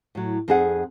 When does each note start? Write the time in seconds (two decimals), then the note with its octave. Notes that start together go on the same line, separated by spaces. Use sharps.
0.15 A2 F#3
0.48 F2 C4 D#4 G#4 A4 F#5